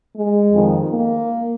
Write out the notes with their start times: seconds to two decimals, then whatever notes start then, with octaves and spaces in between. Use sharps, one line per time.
0.15 G#3
0.52 F2 D#3
0.90 A#3